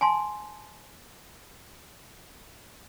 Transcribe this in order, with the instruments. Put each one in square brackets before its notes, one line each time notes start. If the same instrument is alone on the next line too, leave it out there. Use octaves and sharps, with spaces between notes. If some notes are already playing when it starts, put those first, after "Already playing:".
[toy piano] G#5 A5 C6